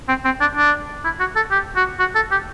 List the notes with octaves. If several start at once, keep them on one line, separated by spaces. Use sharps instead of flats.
C4
C4
D4
D4
E4
F#4
A4
G4
F#4
F#4
A4
G4